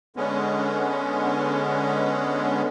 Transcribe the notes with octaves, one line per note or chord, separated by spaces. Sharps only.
D3 G#3 B3 C#4